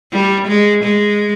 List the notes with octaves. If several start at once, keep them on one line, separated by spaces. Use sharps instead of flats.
G3
G#3
G#3